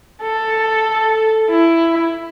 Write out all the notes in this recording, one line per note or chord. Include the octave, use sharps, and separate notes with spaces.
A4
E4